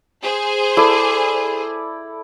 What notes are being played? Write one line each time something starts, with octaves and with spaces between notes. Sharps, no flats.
G#4 C5
E4 A4 D5